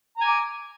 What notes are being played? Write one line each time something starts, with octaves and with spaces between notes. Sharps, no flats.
G#5 A#5 D6